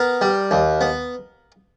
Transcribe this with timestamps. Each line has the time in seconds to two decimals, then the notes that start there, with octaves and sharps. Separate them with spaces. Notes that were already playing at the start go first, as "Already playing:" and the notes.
Already playing: B3 A#4
0.21 G3
0.51 D#2
0.81 B3